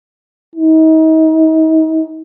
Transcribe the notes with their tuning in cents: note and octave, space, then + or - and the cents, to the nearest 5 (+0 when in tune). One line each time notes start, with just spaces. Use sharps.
D#4 +35